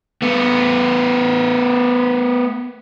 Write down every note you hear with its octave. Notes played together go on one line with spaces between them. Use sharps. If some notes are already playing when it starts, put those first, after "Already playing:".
A3 B3